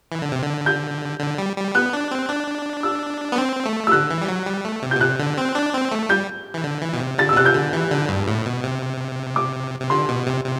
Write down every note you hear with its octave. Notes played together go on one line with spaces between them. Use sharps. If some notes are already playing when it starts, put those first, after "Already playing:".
E3
D3
C3
D3
G6
D3
G3
G3
B3 F#6
D4
C4
D4
E6
B3
C4
A3
E6
D3 F#6
E3
G3
F#3
G3
A3
C3
G6
B2
C3 F#6
D3
C4
D4
C4
A3
G3 G6
E3
D3
E3
B2
C3
D3 A6
E6
B2
C3 F#6
G6
D3
E3
D3
G2
A2
B2
C3
D6
C3
D3 C6
B2
C3
C3